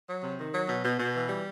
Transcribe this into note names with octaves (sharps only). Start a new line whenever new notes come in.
F#3
C3
D#3
F#3
B2
B2
B2
E3
G3